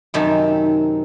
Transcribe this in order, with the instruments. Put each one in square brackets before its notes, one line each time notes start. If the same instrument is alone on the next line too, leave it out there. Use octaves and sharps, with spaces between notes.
[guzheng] F#2 C3 D#3 A5